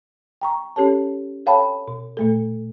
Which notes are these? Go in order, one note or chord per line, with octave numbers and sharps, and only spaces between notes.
G5 A#5 C#6
C#4 G4 A4 C#5 A5
A4 C#5 F5 G5 A5 B5
B2
A#2 A3 A4